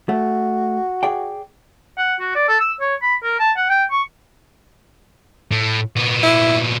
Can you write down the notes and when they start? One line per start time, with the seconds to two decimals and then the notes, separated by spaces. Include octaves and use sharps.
0.09 A3 F#4
1.03 G#4 D5 G5
1.98 F#5
2.20 F#4
2.35 D5
2.48 A4
2.60 E6
2.80 C#5
3.02 B5
3.23 A#4
3.39 A5
3.57 F#5
3.69 G5
3.91 C#6
5.51 A2
5.96 A#2 B3
6.23 E4